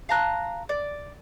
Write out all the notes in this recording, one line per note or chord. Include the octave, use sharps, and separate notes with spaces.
F5 A5 A#5 F#6
D5